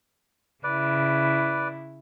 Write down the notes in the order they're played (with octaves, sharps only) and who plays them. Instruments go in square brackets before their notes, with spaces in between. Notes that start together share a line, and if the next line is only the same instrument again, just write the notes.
[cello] C#3 E4 [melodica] B4 D5